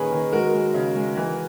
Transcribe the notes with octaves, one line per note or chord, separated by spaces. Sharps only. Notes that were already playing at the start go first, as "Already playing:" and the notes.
Already playing: A#2 D#3 A#3 C#4 G#4 A#4 B4 C#5
D#3
G#3 F#4 A#4
G#3
C#3
G#3
E3